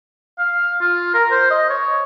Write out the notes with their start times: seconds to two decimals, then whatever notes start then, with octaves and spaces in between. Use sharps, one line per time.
0.39 F5
0.81 F4
1.14 A#4
1.31 C5
1.51 D#5
1.70 C#5